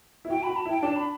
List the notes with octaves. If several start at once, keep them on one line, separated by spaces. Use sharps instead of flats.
E4
F#4 G5
F#4 B5
A5
E4
G5
D4 A5
B5